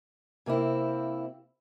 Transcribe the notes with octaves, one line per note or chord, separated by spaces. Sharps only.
C3 A#3 C4 E4